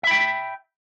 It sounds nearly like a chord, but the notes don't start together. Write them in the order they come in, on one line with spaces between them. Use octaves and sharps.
E5 B5 G5